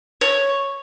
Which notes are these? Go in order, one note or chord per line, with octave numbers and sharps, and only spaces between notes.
C#5